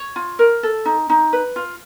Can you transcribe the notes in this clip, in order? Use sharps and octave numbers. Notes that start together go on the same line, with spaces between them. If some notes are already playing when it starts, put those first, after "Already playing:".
Already playing: C#5
F4
A#4
A4
D#4
D#4
B4
F4